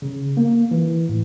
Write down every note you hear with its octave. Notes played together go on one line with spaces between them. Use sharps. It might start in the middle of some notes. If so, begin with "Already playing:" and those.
C#3
A#3
E3
A2